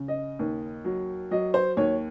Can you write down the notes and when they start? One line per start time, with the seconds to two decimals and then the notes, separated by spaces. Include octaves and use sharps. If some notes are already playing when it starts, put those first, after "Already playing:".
Already playing: C#3
0.08 D#5
0.39 D#2
0.85 F#3
1.31 F#3 D#5
1.54 C5
1.77 D#2 C#5